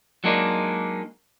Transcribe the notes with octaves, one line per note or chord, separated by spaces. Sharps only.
F#3 G#3 A#3 D4 D#4